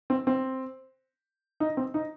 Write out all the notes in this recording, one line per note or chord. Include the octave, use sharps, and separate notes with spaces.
C4
C4
D#4
C4
D#4